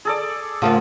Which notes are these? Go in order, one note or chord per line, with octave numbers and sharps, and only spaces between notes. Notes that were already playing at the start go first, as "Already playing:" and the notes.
G#4 A4 D5
C#3 F3 A3 A#3 F4 F#5